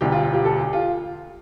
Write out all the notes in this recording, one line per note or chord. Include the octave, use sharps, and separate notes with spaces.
E1 D2 D3 G3 G4
F4
F4
G4
A4
G4
F4